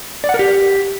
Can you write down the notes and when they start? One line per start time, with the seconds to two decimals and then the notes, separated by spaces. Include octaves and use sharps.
0.24 D5
0.29 F#5
0.34 A#4
0.39 G4